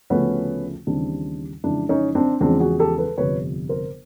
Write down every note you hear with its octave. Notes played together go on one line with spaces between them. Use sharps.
D2 C#3 F3 A3 B3 C#4
D#2 C#3 E3 G3 C4 D4
F2 C#3 E3 G#3 D4 E4
C#4 D#4
C4 D4
E2 C#3 F3 G#3 C4 D4
F#4 G#4
G4 A4
A4 B4
G1 F2 C3 B4 C#5
A#4 C5